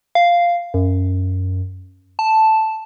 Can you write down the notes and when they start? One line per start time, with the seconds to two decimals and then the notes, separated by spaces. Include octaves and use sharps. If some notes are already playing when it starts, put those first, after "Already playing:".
0.15 F5
0.74 F#2
2.19 A5